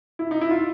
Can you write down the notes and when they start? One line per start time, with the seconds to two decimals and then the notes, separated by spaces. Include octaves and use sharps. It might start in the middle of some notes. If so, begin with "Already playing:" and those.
0.19 E4
0.31 D#4
0.41 E4
0.51 F4